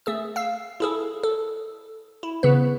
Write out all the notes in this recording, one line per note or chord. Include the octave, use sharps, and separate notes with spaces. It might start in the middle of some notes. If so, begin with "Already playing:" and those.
A3 G#4 E6
F5 E6
E4 G#4 A4
A4
E4
C#3 B3 B4